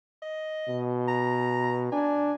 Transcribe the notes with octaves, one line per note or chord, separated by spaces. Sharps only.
D#5
B2
A#5
D4 G#5